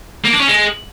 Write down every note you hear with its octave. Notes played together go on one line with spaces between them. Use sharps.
A#3
D4
C#4
G#3